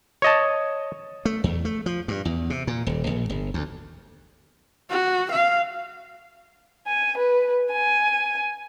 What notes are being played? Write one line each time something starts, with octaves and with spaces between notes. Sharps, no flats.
C#5 D#5 A5
A3
E2
A3
F3
G2
E2
C3
A#2
D#1
A#1
G1
D2
F#4
F5
G#5
B4
G#5